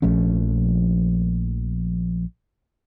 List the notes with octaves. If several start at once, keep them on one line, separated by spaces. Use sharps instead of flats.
A#1 F3 A3 C#4